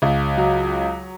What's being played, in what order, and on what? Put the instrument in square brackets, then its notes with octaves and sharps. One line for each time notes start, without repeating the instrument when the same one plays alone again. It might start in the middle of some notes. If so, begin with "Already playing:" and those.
[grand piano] C#2
F#3